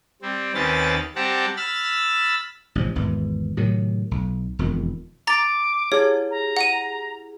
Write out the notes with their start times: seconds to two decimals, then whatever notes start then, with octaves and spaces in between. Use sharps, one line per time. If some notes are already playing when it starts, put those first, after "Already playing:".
0.22 G3 C4
0.55 D#2 D#3 C4 C#4 B4 A6
1.16 G3 C4 G4 F#5 A5 A#5
1.57 B5 E6 F6 A6
2.75 A1 C3 F3
2.95 G#1 E2 E3
3.57 A2 C3 D#3 F#3
4.11 B1
4.59 E1 F2 D#3
5.27 A#5 D6 A6
5.92 E4 G4 G#4 C#5
6.31 A#5
6.57 F#5 D#7